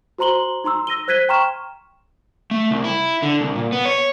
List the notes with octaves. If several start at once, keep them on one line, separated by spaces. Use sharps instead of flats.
F#4 C5 A#5 C6 F#7 G7
D#4 A#5 C6 E6
E6 A#6 D#7 G7
C5 F#6 G#6 B6 D#7 G7
G5 A#5 C6 C#6 F6 E7
A3
C2
E4
D3
C2
A#2
B3
C#5